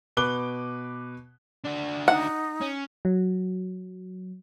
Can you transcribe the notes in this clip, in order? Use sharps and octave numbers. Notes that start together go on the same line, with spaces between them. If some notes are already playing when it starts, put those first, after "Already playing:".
B2 B4 D6 F#6 G7
D4 F#4
D#4 F#5
C#4
F#3